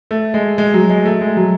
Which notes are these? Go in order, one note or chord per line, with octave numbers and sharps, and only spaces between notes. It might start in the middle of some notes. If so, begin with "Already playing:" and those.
A3
G#3
G#3
F#3
G#3
A3
G#3
F#3